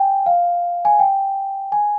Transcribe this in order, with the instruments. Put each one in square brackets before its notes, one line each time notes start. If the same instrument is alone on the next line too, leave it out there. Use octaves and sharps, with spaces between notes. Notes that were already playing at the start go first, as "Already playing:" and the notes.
Already playing: [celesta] G5 G#5
F5
G#5
G5
G#5